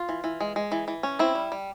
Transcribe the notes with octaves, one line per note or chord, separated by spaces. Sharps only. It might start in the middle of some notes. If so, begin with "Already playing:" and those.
Already playing: F4
E3
E3
G#3
G#3
E3
E3
C#4
C4 E4
G3
G3